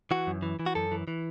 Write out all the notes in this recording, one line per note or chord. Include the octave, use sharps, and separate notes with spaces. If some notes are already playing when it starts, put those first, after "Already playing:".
E3 F#4
F#2
E3
E3
F#4
F#2 A4
E3
E3